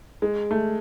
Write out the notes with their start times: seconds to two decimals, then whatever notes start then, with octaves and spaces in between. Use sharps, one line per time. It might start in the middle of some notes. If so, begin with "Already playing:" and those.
0.22 G#3
0.51 A3